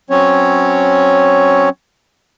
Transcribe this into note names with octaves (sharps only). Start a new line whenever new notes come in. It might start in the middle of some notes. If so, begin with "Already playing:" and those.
F#3 C4 C#4 C#5